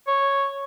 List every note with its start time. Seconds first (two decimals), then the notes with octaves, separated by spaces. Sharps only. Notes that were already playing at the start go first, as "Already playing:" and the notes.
0.07 C#5